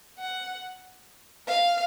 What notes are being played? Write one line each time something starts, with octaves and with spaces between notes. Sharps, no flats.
F#5
F5